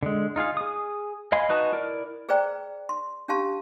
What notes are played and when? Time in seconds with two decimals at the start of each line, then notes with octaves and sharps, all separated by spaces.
0.03 D3 G#3
0.36 D#4 F4 G#4 F5
0.57 G#4 D#6
1.32 D#5 F5 G#5 B5 C6
1.49 D#4 F#4 B4 D#5 A5
1.73 E4 A#4 D5
2.29 G#4 B4 C5 D5 G5 A#5
2.89 C6
3.28 C#4 D4 G4 F5 A5 C6